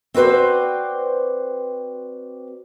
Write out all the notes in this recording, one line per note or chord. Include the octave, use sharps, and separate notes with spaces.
C4 F#4 B4 C5 D5